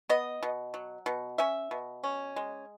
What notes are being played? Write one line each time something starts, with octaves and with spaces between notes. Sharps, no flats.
B3 D#5
B2
F#3
B2
C#4 E5
B2
C#4
G#3